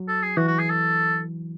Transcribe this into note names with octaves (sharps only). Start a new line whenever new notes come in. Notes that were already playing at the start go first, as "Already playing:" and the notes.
Already playing: F#3
A4
G#4
E3 F#4
F#4
G#4
A4